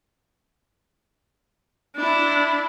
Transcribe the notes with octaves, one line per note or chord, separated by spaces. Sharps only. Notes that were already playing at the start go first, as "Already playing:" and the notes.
D4 E4